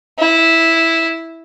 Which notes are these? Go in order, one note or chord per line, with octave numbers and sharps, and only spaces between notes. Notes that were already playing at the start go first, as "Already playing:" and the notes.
E4